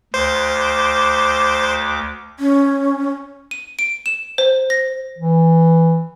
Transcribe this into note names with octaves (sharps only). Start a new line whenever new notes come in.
D2 C5 D6
C#4
D#7
D7
E7
C5
A#6
E3